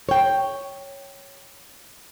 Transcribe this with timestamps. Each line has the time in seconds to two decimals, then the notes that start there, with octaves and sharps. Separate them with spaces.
0.09 C#5 G5